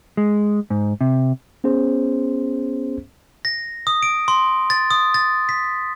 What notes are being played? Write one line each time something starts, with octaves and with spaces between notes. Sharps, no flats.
G#3
G#2
C3
B3 C#4 G#4 C5
A#6
D#6
D7
C6
A6
D#6
A6
B6